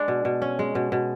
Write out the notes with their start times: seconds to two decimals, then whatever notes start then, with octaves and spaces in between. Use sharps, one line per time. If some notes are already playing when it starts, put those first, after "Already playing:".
Already playing: G#3 D4
0.08 B2
0.25 B2
0.42 C#4
0.59 G#3
0.75 B2
0.92 B2